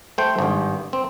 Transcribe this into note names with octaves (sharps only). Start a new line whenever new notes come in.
A3 C5 G5
G#1 G2
C4